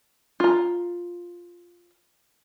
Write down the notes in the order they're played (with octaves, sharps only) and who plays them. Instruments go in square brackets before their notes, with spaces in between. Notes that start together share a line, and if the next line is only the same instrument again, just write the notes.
[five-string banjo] F4 A#5